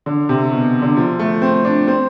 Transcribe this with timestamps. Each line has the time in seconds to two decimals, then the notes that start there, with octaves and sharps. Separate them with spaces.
0.06 D3
0.29 C3
0.52 B2
0.82 D3
0.97 F3
1.19 A3
1.42 C4
1.65 D4
1.88 C4